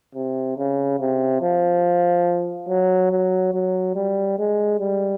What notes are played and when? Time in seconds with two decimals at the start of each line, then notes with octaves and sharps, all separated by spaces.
0.15 C3
0.57 C#3
0.99 C3
1.41 F3
2.69 F#3
3.11 F#3
3.54 F#3
3.95 G3
4.38 G#3
4.80 G3